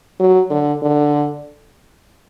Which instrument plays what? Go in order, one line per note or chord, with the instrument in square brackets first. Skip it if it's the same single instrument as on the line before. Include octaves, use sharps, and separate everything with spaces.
[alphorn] F#3
D3
D3